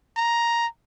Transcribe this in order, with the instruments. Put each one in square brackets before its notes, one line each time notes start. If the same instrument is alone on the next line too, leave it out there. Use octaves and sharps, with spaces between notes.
[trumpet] A#5